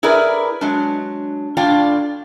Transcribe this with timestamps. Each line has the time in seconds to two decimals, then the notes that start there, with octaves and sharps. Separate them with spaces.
0.03 E4 G#4 A#4 B4 D5
0.61 F#3 G#3 D4
1.57 A2 D4 F4 D5 G5